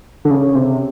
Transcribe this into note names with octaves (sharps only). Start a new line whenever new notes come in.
D3
C#3
C3